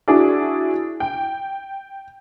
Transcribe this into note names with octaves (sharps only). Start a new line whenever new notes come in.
D4 E4 F#4 G#4
G5